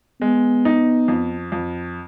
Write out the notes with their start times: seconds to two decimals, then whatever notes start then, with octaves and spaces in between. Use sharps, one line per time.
0.21 G#3 B3
0.65 D#4
1.08 F2
1.52 F2